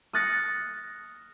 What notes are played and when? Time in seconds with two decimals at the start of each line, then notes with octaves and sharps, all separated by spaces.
0.13 D#6 F6 F#6 A6 A#6 C#7